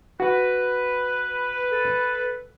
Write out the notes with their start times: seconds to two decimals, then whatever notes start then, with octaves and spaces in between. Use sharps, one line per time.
0.20 F#4 B4
1.72 A4